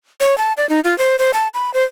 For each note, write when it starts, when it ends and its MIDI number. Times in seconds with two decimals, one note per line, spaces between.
0.20 0.37 73
0.38 0.53 81
0.57 0.68 74
0.69 0.80 63
0.84 0.97 65
0.98 1.16 72
1.19 1.31 72
1.34 1.48 81
1.54 1.73 83
1.74 1.83 72